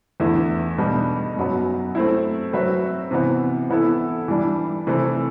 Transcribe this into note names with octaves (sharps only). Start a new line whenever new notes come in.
E2 D3 A3 E4 A4
B2 G3 D4
F#2 F#3 B3
A3 C4 E4
F#3 C4 F#4 B4 E5
C3 E3 B3
E3 B3 E4 A4
E3 G3 D4
C3 E3 A3 E4 A4